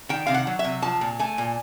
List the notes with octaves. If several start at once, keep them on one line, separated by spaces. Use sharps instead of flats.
D#3 G5
C3 F5
F#5
F#3
E5
C3
F3 A5
A#2
A3 G#5
A#2